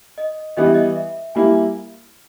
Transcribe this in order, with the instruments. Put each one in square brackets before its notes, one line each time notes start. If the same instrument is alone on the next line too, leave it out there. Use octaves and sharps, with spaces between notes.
[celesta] D#5
[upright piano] E3 G3 B3 [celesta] D#5
[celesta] E5
D#5
E5
[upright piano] G3 A#3 E4 [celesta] G#5